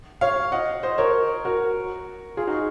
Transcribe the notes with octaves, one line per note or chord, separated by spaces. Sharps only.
C#5 F5
D#5 F#5
C5 D#5
A#4 C#5
F#4 A#4
F4 G#4
D#4 F#4